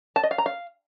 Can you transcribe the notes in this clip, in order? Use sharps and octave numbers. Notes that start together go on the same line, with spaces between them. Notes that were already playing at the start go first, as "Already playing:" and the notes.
A5
D#5
F5
A#5
F5